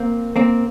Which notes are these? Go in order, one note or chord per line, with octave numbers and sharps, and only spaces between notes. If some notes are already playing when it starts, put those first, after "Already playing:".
Already playing: A#3 C4
A#3 C4